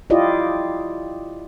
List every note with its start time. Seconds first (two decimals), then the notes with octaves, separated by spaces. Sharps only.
0.10 E4 F4 G4 D5 D#5